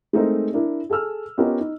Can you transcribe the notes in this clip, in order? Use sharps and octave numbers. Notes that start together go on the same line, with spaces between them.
G#3 A3 C4 D#4 A#4 C5
D4 E4 A#4
G#4 A4 G#5 E6 F6
B3 C#4 F4 G4 A#4 D#5
D#4